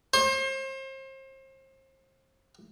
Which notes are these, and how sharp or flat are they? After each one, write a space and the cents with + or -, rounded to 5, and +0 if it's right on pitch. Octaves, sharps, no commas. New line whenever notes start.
C5 +35